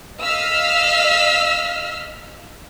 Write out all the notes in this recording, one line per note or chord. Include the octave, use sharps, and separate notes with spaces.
D#5 F5 E6 F6 B6 C7